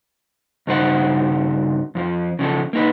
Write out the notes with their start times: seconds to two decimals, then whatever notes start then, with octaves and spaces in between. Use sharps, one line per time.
0.67 G2 C#3 D#4 F#4 C5 F#5
1.95 F2 E3 F3
2.39 C#3 F3 D4 A4
2.73 A#3 D#4 B4